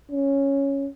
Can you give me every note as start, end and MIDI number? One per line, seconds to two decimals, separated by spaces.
0.11 0.88 61